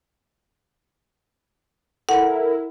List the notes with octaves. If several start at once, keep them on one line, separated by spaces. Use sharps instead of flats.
E4 A4 A#4 F#5